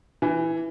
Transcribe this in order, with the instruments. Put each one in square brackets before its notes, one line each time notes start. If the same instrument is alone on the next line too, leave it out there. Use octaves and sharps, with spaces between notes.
[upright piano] E3